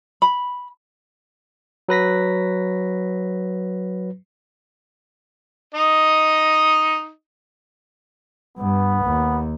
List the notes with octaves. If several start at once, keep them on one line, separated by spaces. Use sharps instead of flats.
B5
F#3 B4 A#6 B6
D#4 D#5
G2 B3
D#2